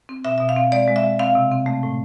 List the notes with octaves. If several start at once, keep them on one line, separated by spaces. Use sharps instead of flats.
C4
B2 E5
B2 E5
F5
C4
G#3 D5
G#3
E5
G#3
C4 F5
C3
C4
A3
A2